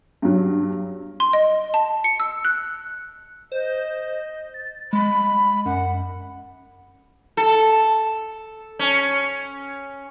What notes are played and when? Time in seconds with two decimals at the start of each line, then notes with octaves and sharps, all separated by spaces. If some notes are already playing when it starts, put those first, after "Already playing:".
0.22 G2 F#3
1.20 C6
1.33 D#5
1.74 A5
2.04 C#7
2.20 E6
2.45 F#6
3.52 C5 D#5
4.54 A6
4.93 G#3 B5
5.66 F#2 F#5
7.37 A4
8.79 C#4